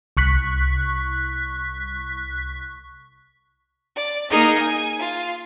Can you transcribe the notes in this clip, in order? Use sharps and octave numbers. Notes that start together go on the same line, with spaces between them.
C2 C#6 F#6 B6
D5
A#3 D#4 G#4 A#4 D#5
G#5
F4